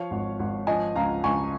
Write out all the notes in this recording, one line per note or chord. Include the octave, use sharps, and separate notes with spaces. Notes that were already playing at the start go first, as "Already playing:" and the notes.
Already playing: F3 C#5 F5
G#1
G#1
F3 D#5 G#5
C#2 F5 A#5
C#2 G#5 C#6